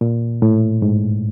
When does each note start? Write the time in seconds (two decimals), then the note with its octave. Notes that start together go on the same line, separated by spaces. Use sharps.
0.01 A#2
0.42 A2
0.82 G#2